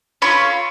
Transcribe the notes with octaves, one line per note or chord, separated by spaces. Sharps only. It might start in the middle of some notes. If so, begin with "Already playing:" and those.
C#4 F4 A4 B5 C#6